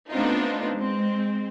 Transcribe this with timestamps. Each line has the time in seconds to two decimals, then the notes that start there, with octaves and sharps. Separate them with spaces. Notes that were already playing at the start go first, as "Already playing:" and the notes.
0.11 A3 B3 C4 D4 D#4 F4
0.75 G#3 C4